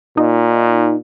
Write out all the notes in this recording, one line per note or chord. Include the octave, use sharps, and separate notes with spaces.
A#2 D#4